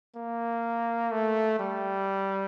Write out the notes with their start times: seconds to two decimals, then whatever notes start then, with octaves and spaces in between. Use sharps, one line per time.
0.16 A#3
1.12 A3
1.59 G3